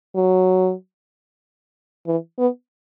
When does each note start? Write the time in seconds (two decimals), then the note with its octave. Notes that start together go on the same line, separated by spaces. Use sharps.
0.15 F#3
2.07 E3
2.39 B3